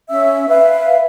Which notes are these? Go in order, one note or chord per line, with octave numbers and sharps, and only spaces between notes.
C#4 E5 E6
B4 E5 F5